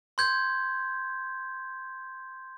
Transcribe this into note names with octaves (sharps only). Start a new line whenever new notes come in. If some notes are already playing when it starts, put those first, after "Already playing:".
C6 G6 G#6